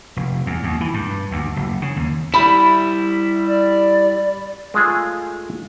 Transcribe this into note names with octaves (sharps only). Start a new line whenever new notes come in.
F1
E2
D#2
E3
G2
D2
F#1
C#3
D#2
G3 E4 B5
D5
G#3 A3 F4 G#4